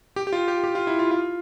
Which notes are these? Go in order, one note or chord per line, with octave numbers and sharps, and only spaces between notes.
G4
G4
F4
G4
G4
F4
E4
F4
F4